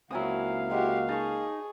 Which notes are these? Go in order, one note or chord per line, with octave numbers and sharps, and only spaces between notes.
C#2 F#3 A#3 C4 E4 F5 G#5 D#6
G#3 F#4 G4
D#4 G#4 A5 C#6